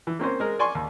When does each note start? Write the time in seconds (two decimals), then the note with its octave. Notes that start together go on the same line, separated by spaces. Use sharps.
0.07 E3
0.19 A#3 C4 C#4 C5
0.40 G#3 A#4
0.59 D5 G#5 C6 C#6
0.75 D#2